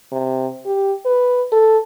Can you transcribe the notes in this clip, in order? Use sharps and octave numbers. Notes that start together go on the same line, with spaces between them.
C3
G4
B4
A4